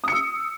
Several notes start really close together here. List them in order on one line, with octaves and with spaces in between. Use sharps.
D#6 C#7 E6